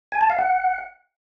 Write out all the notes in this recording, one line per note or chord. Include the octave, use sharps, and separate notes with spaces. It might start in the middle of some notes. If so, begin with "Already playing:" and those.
G#5
A5
F5
F#5